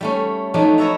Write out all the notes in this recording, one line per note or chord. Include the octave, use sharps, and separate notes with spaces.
G3 A3 C#4
F3 F#3 A3 D4 D#4
B4 C#5 D#5 E5 A5 A#5